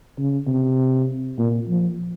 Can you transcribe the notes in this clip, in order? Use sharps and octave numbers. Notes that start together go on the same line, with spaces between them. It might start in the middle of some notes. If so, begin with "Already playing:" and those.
C#3
C3
A#2
F3